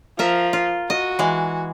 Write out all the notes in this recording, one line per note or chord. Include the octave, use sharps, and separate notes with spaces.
F3 A#4 E5
F4
F#4 D#5
E3 G#3